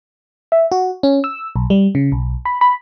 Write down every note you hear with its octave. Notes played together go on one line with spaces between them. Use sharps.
E5
F#4
C#4
E6
B1
G3
C#3
B1
B5
B5